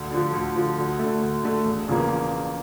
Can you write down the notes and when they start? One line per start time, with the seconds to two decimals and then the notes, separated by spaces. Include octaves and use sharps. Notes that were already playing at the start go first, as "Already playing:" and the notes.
Already playing: D2
0.12 D3 F3
0.33 D2
0.56 D3 F3
0.78 D2
0.99 D3 A3
1.22 D2
1.44 D3 A3
1.66 E1
1.88 E2 C#3 F3 A#3